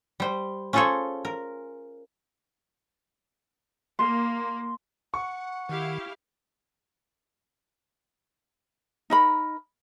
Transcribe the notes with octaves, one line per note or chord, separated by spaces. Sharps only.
G3 C5
C#4 F4 G#4 A4 C5 C#5
A#4
A#3 C6
F#5 C#6
D#3 E4 G4 F5
D#4 A#4 B5